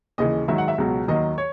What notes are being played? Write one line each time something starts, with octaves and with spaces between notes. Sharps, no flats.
D#2 C#3 E3 D#5
G#2 D#3 F#3 E5
F#5
E5
C#2 B2 F#3
D#2 D#3 F#3 D#5
C#5